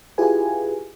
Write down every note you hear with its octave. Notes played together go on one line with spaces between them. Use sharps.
E4 F4 G4 G#4 B4 G#5